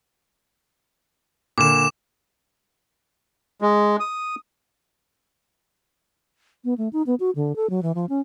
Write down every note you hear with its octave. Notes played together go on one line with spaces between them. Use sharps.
A#2 D3 D6 E7
G#3
D#6
B3
A3
D#4
B3
F#4
D3
A4
F#3
E3
F3
C#4